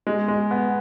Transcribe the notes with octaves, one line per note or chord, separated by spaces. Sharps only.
G#3
G#3
B3